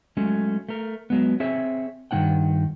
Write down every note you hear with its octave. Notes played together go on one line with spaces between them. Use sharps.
F#3 G#3 A3 C#4
A3 A#4
F#3 G#3 B3
C4 G#4 C#5 E5
G2 D#3 E3 C#4 F#5 G5